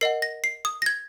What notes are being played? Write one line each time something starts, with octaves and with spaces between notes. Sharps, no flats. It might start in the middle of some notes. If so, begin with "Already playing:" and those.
A#4 D#5 F#5 C7
A#6
C7
D#6
A#6
G#6